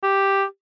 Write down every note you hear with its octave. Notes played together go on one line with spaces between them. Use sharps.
G4